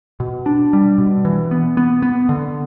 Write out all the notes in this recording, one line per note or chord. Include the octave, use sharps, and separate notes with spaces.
B2
D4
G3
B2
E3
B3
B3
B3
D3